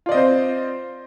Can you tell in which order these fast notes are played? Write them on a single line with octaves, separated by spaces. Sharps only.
F4 D5 D#5 C4 C5